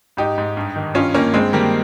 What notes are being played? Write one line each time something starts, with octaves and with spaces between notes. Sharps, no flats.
G#2 D#4 G4
G#2
G2
D#3
G2 C#4 F4
D#3 A#3 C#4
G2 G#3 C4
D#3 G3 A#3